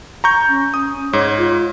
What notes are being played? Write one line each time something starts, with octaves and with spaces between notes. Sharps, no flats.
A#5 C#6 G6
C#4
D#6
G#2 C#5
F4